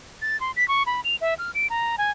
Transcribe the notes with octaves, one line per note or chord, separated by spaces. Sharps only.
A6
C6
B6
C#6
B5
F7
E5
F6
D7
A#5
G#5